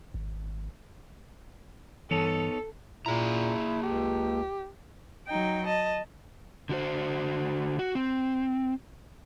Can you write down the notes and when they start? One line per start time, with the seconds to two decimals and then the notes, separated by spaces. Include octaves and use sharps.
0.14 G#1
2.11 G2 E3 B3 D#4 A4 C#5
3.06 A#2 A#3 E4 G#4 A#5
3.83 C#2 G4
5.27 F#3 D#4 G5
5.66 D#5 A5
6.69 D3 F#4 C5
7.79 F#4
7.95 C4